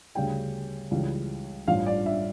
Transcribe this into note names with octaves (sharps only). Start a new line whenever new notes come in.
D2 C#3 G3 C#4 G5
C#2 C#3 E3 G3
A1 G2 F3 C#4 F5
D5
E5